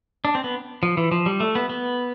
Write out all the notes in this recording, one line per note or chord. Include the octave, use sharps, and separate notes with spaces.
D4
C4
B3
F3
E3
F3
G3
A3
B3
B3